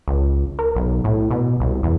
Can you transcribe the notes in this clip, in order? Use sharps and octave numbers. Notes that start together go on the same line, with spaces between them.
C#2
A#4
B1
A2
B2
C2
E2